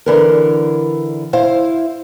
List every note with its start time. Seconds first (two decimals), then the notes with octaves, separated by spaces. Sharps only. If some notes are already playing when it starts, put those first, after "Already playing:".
0.06 D3 E3 A#4
1.33 E4 C5 F5